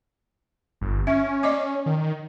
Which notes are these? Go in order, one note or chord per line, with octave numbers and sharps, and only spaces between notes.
G1
C#4 E5
D5 D#5 D6
D#3